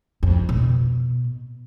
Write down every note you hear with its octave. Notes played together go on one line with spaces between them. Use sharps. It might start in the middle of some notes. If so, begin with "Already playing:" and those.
F2
B2